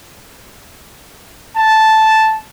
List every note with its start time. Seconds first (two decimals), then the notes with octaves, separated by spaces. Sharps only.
1.56 A5